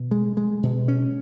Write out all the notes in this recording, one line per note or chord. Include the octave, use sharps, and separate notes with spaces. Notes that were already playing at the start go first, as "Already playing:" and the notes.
Already playing: B2
G#3
G#3
B2
C#4